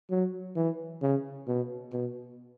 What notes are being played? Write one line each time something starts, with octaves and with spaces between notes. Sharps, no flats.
F#3
E3
C#3
B2
B2